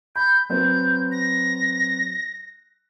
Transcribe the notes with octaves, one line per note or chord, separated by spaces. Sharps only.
B5 G6
F#3 C4 B4 G6
A#6